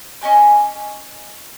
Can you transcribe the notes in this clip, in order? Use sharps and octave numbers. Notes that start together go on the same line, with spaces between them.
C#4 D#5 G#5 D6